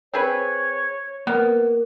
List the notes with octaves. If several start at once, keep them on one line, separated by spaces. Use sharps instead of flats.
C4 G#4 B4 C#5
A#3 B3